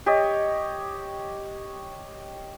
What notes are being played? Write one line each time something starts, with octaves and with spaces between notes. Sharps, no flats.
G4 C#5 D#5